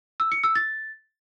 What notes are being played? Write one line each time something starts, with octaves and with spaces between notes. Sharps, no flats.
E6
C#7
E6
A6